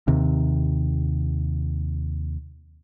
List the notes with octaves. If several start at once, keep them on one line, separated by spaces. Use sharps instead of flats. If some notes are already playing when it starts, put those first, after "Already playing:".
D#2 C3